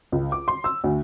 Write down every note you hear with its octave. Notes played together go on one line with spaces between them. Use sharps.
C#2
D6
C6
E6
D2